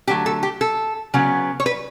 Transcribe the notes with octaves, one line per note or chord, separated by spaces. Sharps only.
D3 F#3 A3 G4
A4
G4
A4
C#3 F#3 B3
C#5
B4